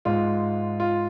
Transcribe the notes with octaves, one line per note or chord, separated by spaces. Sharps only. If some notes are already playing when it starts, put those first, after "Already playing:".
G#2 G#3 F4
F4